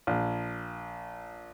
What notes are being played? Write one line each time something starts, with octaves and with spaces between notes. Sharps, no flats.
A#1